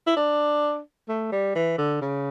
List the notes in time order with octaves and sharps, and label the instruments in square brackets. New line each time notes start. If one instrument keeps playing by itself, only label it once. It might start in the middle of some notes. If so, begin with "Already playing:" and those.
[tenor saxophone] E4
D4
A3
G3
E3
D3
C#3